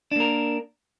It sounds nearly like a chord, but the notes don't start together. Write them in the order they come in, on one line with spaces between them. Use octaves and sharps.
D4 A#3 A#4